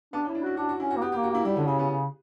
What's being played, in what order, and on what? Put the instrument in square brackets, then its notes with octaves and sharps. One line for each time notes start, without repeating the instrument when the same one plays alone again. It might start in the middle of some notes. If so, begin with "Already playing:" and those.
[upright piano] B3 [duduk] D4
[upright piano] C#4
[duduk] E4
[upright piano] D4
[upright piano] E4 [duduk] F#4
[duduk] D4 [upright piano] F#4
[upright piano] F#4
[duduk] C#4 [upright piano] E4
[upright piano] F#4
[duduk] A#3
[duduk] B3 [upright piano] G4
[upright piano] G4
[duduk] A#3
[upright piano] F#4
[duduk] A#3 [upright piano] E4
[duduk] G3 [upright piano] E4
[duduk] D3 [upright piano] C#4
[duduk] C#3 [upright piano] C#4
[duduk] C#3 [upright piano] B3
[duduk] C#3